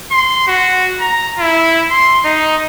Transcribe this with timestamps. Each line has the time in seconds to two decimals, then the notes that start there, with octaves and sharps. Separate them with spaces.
0.11 C6
0.47 F#4
1.00 A#5
1.39 E4
1.91 C6
2.25 D#4